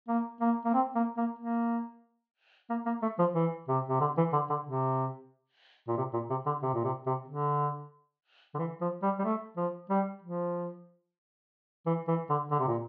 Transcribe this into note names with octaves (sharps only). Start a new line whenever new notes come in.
A#3
A#3
A#3
C4
A#3
A#3
A#3
A#3
A#3
A3
F3
E3
C3
C3
D3
E3
D3
D3
C3
A#2
C3
A#2
C3
D3
C3
A#2
C3
C3
D3
D3
E3
F3
G3
G3
A3
F3
G3
F3
E3
E3
D3
D3
C3
A#2